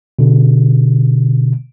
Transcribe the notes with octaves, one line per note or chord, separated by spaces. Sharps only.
B2 D3